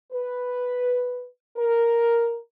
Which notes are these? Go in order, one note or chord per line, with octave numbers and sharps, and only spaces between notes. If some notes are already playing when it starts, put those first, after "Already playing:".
B4
A#4